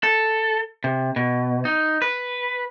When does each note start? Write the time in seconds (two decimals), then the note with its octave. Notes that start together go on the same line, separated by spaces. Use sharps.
0.03 A4
0.84 C3
1.16 B2
1.65 D#4
2.02 B4